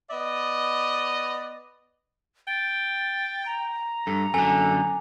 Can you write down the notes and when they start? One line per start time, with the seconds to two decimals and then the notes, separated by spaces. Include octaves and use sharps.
0.10 B3 D5 D#5
2.48 G5 A6
3.46 A#5
4.07 G2 A4
4.34 F#2 D3 A4 G#5